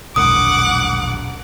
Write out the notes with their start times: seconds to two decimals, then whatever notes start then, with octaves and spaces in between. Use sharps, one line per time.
0.16 E1 A#1 F#2 F#5 D6 D#6